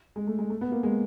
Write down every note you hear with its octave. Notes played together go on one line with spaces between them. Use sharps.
G#3
A3
G#3
A3
B3
A#3
G#3